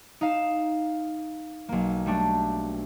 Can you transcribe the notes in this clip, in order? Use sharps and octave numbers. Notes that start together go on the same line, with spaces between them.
D#4 F5 E7
B1 A#3
G3 A3 D4